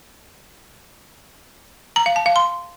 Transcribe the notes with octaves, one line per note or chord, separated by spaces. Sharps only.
A#5
F5
A5
F5
C6